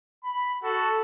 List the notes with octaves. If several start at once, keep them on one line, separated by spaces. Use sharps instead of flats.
B5
F#4 A4